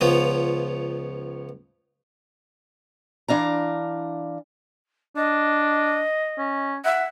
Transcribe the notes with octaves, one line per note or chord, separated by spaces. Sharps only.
C#2 C#3 F3 B3 F4
E3 D4 F5 A#5
D4 D#5
C#4
E5 F#5